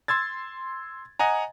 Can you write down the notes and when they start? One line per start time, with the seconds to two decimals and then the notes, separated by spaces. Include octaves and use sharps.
0.08 C6 E6 G#6 A6
1.19 D#5 F#5 G#5 A#5